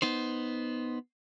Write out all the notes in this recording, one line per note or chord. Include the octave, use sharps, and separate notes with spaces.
B3 D#4 C5